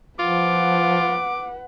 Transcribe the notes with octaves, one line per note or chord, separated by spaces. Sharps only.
F3 F4 B4 F#5 D6